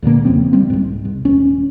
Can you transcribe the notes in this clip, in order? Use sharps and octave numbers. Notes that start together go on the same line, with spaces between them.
C#2 A#2 D3 A#3
E1 F2 C#3 C4
G3 C4
C2 G#2
C2
D#1 C#4